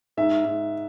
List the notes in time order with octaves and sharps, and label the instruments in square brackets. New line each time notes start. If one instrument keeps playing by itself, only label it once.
[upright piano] G#2 E5
G#2